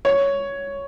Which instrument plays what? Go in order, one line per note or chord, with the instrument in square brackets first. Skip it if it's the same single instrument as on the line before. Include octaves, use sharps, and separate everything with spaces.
[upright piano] C#5